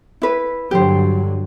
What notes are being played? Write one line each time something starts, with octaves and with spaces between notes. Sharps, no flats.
E4 B4
G2 D3 F#3 G4 C5